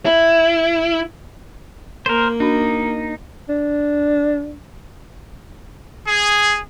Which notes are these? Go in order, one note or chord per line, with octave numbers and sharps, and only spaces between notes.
E4
A#3 A#4 C5
D4 D#4 F#4 B5
D4
G#4